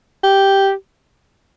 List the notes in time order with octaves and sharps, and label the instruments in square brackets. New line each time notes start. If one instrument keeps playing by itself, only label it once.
[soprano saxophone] G4